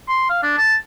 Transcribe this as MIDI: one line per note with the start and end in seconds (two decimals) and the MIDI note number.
0.08 0.27 84
0.30 0.40 77
0.43 0.57 62
0.58 0.75 81